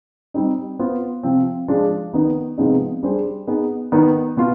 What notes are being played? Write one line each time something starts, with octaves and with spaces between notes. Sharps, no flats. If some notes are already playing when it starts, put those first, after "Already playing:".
G3 C4 D#4
B3 F4 C5
C3 F3 C4
F3 G#3 D4
D#3 B3 D#4 B4
C3 F3 G#3 B3 D#4
G3 D4 G#4 C5
B3 D#4 G#4 B4
D#3 B3 D#4 B4
B2 B3 F4